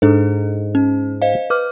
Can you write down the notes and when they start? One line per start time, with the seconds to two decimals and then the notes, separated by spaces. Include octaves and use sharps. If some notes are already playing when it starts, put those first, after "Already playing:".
0.02 G#2 D4 A4
0.75 C#4
1.22 C5 D#5 F5
1.50 B4 D6 F6